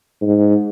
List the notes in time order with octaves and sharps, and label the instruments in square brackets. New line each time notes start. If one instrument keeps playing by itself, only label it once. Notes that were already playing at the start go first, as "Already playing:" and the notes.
[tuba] G#2